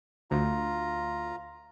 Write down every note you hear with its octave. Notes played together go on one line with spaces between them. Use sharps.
D2 F4 A#5